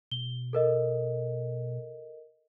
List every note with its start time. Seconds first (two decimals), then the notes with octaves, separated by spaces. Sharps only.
0.11 B2 G7
0.53 A4 A#4 D#5